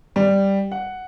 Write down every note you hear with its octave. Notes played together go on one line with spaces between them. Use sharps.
G3
F#5